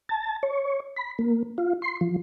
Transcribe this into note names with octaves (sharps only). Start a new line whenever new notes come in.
A5
C#5
B5
A#3
F4
C6
F3